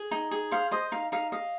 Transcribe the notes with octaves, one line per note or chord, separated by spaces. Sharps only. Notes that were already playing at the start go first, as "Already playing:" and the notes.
Already playing: G#4
D#4
G#4
C5 F5
C5 D#5
D#4 F5
D#4 F5
D#5 F5